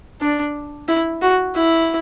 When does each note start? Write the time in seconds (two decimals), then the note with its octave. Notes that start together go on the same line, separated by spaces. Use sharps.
0.21 D4
0.88 E4
1.22 F#4
1.55 E4